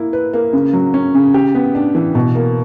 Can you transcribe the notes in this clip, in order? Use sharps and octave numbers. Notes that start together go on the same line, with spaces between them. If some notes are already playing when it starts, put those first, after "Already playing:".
Already playing: A#3 E4
B4
A#3
C#3
F#3
C#4
C#3
G4
B3
D4
E3
B2
A#3